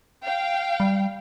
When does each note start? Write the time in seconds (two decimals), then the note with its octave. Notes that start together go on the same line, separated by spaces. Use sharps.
0.23 F5 G5
0.80 G3